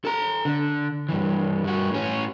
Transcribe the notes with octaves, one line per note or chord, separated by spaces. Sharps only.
A4 A#5
D3
G2 E3
G2 F#4
A2 C#4